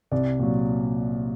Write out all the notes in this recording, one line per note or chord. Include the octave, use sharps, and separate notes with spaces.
C2 D5
A#2 F#3